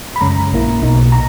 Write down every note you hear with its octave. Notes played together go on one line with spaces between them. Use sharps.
B5
F#2 C#3 G#3 C#4 A#5
A#1 A#2 A#3 E4
B1 B2 A#3 D#4
A#2 A#5